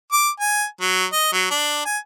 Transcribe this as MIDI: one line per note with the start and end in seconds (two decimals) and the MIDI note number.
0.12 0.29 86
0.40 0.65 80
0.81 1.05 54
1.13 1.30 75
1.33 1.47 54
1.51 1.80 62
1.85 1.98 80